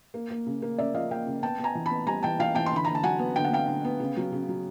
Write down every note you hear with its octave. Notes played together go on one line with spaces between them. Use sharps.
A#3
A#3
C#3
A#3
C#3 D5 E5
F3 D#5 F5
A#3 F5 G5
C#3
B3 G5 A5
B3
G#5 A#5
E3
B3 A5 B5
G3 G#5 A#5
E3 G5 A5
E3 F5 G5
E3 G5 A5
C6
D3 B5
D3 A#5
A5
F#3 F#5 G#5
B3
D3 G5
F#5
B3 F5 G5
D3
B3
C#3
F#3
C#3
F#3